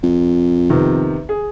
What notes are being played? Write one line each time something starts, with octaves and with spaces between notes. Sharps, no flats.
F2
C3 D#3 B3
G#4